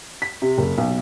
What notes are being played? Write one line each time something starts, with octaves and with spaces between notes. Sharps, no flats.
B6
C3
F#1
B1